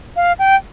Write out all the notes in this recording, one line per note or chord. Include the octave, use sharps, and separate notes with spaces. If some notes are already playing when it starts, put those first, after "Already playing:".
F5
G5